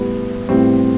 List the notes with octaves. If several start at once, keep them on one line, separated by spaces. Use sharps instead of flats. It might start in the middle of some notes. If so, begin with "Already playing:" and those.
Already playing: A2 G3 B3
A2 G3 C4